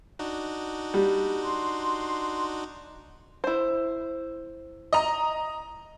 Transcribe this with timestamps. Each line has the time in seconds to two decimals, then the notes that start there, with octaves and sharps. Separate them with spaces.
0.19 D4 D#4 F#4
0.94 G3
1.43 C6
3.44 E4 C5
4.93 D#5 A#5